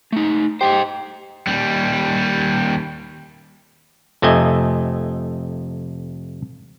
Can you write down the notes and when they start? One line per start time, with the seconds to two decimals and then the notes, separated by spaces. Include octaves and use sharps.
0.12 A3 D#4
0.61 G4 C5 D5 D#5
1.47 D#2 G3
4.22 F2 C3 A3 D#5 G#5